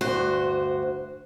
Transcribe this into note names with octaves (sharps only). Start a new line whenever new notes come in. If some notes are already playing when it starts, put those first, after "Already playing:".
D2 G2 F#4 C5